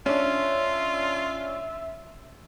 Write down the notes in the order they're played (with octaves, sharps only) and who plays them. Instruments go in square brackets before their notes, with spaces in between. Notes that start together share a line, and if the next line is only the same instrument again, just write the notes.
[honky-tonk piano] C#4 D4 [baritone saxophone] F4 [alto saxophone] E5